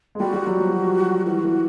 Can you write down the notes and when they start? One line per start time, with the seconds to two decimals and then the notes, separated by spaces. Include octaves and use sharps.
0.15 G#3
0.20 G3 F#4
0.34 G3
0.47 F#3
0.59 F3
1.26 E3 F#4
1.44 E3